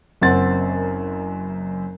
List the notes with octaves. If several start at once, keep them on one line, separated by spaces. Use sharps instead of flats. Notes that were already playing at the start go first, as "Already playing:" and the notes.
F#1 F#2 C4 F#5 A6